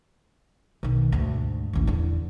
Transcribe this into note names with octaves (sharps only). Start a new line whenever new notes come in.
B1 D#3
D2 G#2
A1 D#2
E2 D3